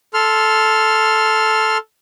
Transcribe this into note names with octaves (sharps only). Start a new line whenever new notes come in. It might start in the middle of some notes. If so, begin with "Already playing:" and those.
A4 C6 F6